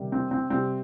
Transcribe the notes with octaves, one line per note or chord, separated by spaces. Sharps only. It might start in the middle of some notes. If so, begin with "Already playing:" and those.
Already playing: C3 D#3 G3
C4
C4
C3 G3 C4